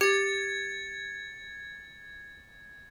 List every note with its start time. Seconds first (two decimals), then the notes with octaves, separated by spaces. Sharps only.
0.01 G4 G#6 A6 C#7